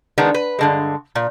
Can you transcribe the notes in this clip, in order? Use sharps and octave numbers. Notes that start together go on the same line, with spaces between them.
D#3 G#3 B3 D4
B4
G2 D3 G#3
A#2